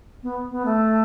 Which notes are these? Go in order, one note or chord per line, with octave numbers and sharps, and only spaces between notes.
B3
B3
A3